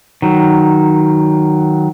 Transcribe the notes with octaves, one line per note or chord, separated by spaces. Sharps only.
D#3 F#3